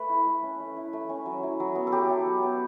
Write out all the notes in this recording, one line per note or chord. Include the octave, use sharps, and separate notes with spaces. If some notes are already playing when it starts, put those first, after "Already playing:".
Already playing: A3 B4
E4
A3
C#4
A3
E4
A3
C#4
F#3
E4
F#3
B3
A4
F#3 G4
E4
F#3
B3